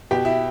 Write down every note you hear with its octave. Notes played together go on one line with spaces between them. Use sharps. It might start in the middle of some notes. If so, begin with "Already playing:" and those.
B2 G4
E4